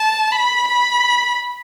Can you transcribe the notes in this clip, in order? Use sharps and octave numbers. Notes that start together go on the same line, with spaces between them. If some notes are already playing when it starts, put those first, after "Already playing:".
Already playing: A5
B5
B5